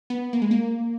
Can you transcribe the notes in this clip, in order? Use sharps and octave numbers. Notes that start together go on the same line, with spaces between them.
B3
A#3
G#3
A#3